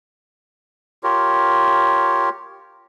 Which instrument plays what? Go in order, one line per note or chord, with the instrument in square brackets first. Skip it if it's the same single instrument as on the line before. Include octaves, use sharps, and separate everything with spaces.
[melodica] F4 G4 A#4 C#5